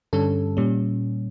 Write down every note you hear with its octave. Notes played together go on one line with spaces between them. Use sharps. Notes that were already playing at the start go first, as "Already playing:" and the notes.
G2 D3 G3 C#4 A4
A#2 G3 C#4